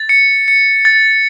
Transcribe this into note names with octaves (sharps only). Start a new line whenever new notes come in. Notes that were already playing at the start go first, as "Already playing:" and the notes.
Already playing: A6
C#7
C#7
A6